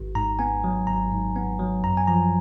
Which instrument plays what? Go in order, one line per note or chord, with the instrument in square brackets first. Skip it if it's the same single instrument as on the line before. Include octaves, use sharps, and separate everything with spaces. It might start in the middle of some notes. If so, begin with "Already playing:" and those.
Already playing: [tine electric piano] G#1
G#2 A#5
B3 G#5
F#3
G#1 A#5
G#2
B3
F#3
F#2 A#5
G#5
F3 A#5